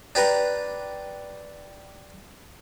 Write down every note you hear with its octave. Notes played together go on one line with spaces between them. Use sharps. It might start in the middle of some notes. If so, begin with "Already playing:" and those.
D4 G4 B4 A#5